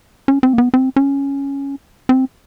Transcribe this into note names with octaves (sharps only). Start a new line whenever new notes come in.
C#4
C4
A#3
B3
C4
C#4
C4